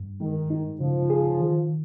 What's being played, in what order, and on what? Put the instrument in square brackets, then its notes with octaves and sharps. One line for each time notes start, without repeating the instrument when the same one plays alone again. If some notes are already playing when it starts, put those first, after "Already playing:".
Already playing: [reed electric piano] G2
[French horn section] D#3 [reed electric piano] G#3
[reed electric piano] D#4
[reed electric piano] C#3 [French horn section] F3
[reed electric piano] G#4
D#3